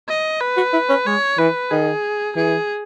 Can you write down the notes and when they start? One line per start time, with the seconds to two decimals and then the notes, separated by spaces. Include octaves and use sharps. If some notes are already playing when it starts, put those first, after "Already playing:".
0.09 D#5
0.41 B4
0.57 F#4
0.73 E4
0.89 C#4
1.06 G#3 C#5
1.38 E3 B4
1.71 D#3 G#4
2.36 E3 G#4